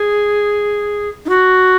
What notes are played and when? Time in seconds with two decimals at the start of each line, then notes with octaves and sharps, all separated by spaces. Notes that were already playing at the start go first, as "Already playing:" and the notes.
Already playing: G#4
1.25 D#4
1.29 F#4